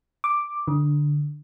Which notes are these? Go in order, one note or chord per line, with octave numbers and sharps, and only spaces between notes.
D6
D3